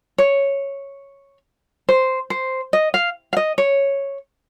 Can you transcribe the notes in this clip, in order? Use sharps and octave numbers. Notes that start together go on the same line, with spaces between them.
C#5
C5
C5
D#5
F5
F5
D#5
C#5